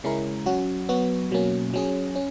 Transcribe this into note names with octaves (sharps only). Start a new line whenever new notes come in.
C#3 G#3 C#4 E4 A#4
F#3 C#4 F#4
F#3 B3 F#4
B2 F#3 A#3 C#4
F#3 C#4 G#4
C#4